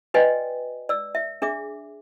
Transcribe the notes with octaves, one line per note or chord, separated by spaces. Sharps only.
F#4 B4 D5 D#5 G5 G#5
D5 E6
E5
D4 G#4 E5 D6